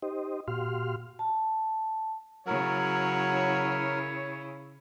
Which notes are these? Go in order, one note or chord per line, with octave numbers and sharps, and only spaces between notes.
D#4 G4 C5 D#5
A#2 F#4 G4 F5 C6 F6
A5
C#3 F#3 E4 A#4 C#5